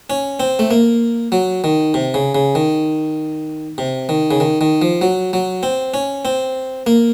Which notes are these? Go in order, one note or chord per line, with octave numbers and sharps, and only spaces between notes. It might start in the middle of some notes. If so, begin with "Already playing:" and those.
C#4
C4
A3
A#3
F#3
D#3
C3
C#3
C#3
D#3
C3
D#3
C#3
D#3
D#3
F3
F#3
F#3
C4
C#4
C4
A#3